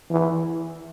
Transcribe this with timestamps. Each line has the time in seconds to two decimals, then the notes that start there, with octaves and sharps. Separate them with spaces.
0.11 E3